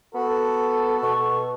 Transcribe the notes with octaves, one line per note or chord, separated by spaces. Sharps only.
B3 F#4 A4
B2 C#6